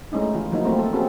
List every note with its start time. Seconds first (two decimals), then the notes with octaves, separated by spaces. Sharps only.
0.12 G#3 A3 C#4 D#4 E4
0.35 E3 F4
0.52 F3 F#3 A#3 D#4 E4
0.65 A3 A#3 C4 F4
0.79 C4 A4
0.93 A#3 C4 C#4 F#4 G#4 A4